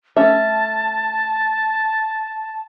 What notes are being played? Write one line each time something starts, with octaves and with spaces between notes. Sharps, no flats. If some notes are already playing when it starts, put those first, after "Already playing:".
A3 C#4 E5 A5